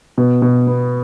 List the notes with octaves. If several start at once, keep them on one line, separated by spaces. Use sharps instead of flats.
B2
B2
B3